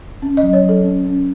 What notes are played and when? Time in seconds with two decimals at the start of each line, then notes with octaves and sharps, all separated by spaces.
0.22 C#4
0.37 D#5
0.43 F#3
0.53 C#5
0.64 F#3
0.69 A4
0.84 C#4
1.05 C#4